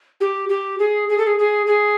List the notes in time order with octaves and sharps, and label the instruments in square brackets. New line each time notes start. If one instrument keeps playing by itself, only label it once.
[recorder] G4
G4
G#4
G#4
A4
G#4
G#4
G#4